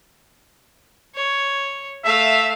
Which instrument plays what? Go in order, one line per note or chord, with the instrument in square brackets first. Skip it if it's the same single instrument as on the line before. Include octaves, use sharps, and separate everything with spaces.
[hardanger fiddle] C#5
[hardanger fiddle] A3 F5 [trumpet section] E5